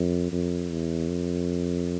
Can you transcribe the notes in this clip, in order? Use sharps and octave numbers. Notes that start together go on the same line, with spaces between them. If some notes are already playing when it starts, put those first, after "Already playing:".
Already playing: F2
F2
E2
F2